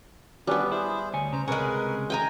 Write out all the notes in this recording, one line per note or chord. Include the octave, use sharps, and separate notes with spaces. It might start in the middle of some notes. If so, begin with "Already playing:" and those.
G3 B3 C#4 D4 B4
E4 G#4 C5
D2 C#5 G#5
C#3 C5 A#5
C#2 C3 G#3 C#4 G#4 A#4 B4
G5 G#5 A#5